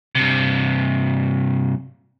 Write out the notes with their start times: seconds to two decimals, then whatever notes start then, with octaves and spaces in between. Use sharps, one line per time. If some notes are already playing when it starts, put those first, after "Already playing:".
0.15 G2 C3